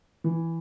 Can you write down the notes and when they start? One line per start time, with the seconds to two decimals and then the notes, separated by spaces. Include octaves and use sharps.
0.24 E3